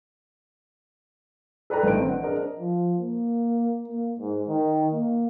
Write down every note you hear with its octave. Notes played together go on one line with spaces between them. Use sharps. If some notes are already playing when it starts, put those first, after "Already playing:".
A4 B4 D5 G5 A5 A#5
A1 D#3 C5 D7
E3 C4 D4
F#5
D4 G#4 A#4 C5 D5 D#5
F3
A#3
A#3
G#2
D#3
A#3